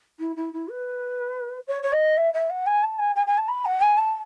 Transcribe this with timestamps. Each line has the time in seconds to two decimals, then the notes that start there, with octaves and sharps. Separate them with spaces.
0.20 E4
0.36 E4
0.53 E4
0.70 B4
1.67 C#5
1.83 C#5
1.93 D#5
2.17 E5
2.34 E5
2.50 F#5
2.66 G#5
2.83 A5
2.99 G#5
3.16 G#5
3.27 G#5
3.38 A5
3.48 B5
3.65 F#5
3.81 G#5
3.97 A5